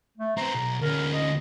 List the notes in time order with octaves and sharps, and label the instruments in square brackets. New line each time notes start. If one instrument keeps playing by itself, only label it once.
[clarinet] A3
[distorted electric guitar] B3 C4 [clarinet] A#5
[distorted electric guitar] B1
[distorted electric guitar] D2 C#4 [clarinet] A#4
[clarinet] D#5